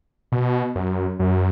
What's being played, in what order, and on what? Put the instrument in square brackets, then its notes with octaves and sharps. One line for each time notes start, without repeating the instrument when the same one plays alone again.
[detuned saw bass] B2
F#2
F#2